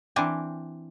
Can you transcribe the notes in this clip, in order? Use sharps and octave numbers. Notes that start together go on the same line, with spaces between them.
E3 C4 D4 G#5